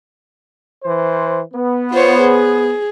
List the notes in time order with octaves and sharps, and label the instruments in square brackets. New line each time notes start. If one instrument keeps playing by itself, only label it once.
[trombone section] E3 C5
B3
[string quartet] F4 C5 C#5
G#4